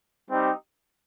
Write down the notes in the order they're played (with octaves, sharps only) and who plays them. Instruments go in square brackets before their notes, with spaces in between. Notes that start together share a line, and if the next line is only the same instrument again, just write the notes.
[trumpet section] G3 C4 D#4 G4